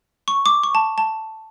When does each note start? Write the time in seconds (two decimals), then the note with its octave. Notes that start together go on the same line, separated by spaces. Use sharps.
0.28 C#6
0.46 D6
0.63 C#6
0.75 A5
0.98 A5